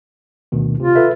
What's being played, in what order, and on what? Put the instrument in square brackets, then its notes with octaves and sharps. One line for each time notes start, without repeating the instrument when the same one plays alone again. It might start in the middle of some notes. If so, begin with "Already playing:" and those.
[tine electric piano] D2 B2 D#3
[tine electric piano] C3 [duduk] F4
[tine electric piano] A4 B4 E5